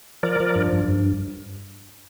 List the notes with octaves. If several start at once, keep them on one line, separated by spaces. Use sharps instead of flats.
F3 A#4 D5
F3
G2
G2
G2